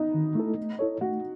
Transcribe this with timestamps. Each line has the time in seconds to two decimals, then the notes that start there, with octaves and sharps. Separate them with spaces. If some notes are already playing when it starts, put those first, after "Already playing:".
Already playing: B3 D#4
0.14 D#3
0.35 A3 E4 A4
0.58 A3
0.79 E4 A4 C#5
1.01 A3 F#4